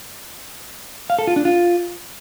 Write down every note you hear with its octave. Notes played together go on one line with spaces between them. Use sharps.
F5
A4
F4
D4
F4